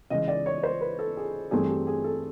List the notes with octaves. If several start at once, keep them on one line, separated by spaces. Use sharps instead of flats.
C#3 E3 G#3 D#5
D5
C#5
C5
B4
A4
G#4
G2 E3 A3 C4 G#4
G4
G#4
A4